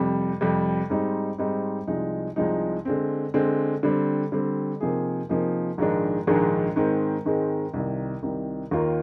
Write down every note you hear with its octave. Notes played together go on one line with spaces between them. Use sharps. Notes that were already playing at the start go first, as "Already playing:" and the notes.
Already playing: F2 C3 G3
F2 C3 G3
G#2 G3 C4 D#4
G#2 G3 C4 D#4
C2 C3 F3 G#3 D#4
C2 C3 F3 G#3 D#4
D3 G#3 C4
D3 G#3 C4
D3 G3 C4
D3 G3 C4
C3 F3 A#3 D#4 G#4
C3 F3 A#3 D#4 G#4
A#1 G#2 D#3 G#3 D4
A#1 G#2 D#3 G#3 D4
G#2 D#3 G#3 C4
G#2 D#3 G#3 C4
C2 C3 D#3
C2 C3 D#3
D#2 D#3 A#3 F4 A#4